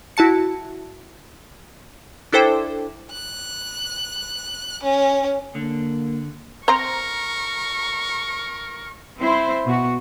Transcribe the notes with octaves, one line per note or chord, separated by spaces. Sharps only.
E4 F#4 A5 C#7
D4 E4 A4 C5 G5 D6
F#6
C#4
D3 A#3
C4 A#4 C5 A#5 C#6
C4 E4 C5
B2 F#4